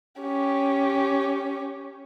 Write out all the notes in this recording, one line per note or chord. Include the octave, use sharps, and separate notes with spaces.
C#4 G4